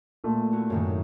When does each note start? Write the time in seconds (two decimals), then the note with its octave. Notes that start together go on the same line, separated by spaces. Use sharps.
0.24 A#2 A3
0.52 B3 E4 F#4
0.70 F#2 A2 D#3